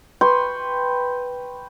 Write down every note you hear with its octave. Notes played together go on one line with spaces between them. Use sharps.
B4 G5 C6 C#6